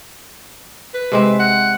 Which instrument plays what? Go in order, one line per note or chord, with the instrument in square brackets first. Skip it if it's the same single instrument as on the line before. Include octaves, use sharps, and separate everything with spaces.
[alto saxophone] B4
[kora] C3 G#3 C4
[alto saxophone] F#5